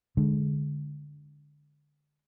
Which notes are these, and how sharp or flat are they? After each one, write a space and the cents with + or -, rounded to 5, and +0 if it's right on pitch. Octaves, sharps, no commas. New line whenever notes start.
D3 +0 G#3 +0